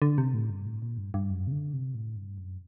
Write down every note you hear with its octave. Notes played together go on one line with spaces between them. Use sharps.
D3
C3
A2
G2
A2
A#2
G2
G2
F#2
C3
D3
C3
A2
G2
F#2